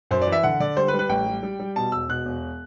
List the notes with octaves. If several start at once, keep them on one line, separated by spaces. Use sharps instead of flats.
F#2 C5
D5
E3
E5
D3 F#5
D3 D5
G3 C5
B4
G3
B4
A1 G5
G3
G3
G3
B2 A5
E1 E6
B2 F#6
E1